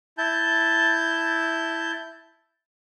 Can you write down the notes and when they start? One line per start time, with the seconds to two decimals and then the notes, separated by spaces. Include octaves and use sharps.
0.18 E4 A5 G6